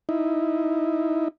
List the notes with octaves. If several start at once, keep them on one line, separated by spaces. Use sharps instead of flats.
D#4 E4